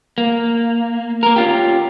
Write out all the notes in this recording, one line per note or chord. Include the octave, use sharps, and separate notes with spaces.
A#3
A#3 A#4
C#4 F4 G4